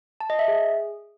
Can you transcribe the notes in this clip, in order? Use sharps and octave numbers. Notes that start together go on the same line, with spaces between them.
A5
D#5
E5
G#4